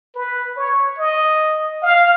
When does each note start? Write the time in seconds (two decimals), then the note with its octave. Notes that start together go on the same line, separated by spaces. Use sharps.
0.15 B4
0.57 C#5
0.99 D#5
1.83 F5